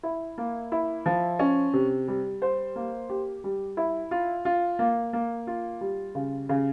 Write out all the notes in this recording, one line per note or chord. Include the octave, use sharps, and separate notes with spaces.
E4
A#3
E4
F3
C#4
C3
G3
C5
A#3
G4
G3
E4
F4
F4
A#3
A#3
F4
G3
C#3
C#3